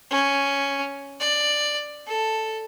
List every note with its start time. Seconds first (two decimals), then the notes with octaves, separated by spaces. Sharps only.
0.11 C#4
1.20 D5
2.07 A4